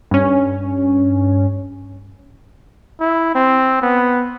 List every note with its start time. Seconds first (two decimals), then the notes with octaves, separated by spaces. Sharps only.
0.11 G2 C#4
3.00 E4
3.35 C4
3.82 B3